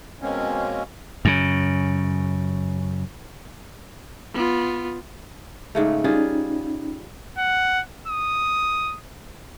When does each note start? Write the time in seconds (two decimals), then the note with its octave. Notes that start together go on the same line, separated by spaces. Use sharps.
0.22 B2 G#3 A#3 C4 C#4
1.25 F#2 C#3
4.34 B3 F4
5.75 G#2 C#3 A3
6.04 G3 C#4 D#4 F4 G#4
7.38 F#5
8.08 D#6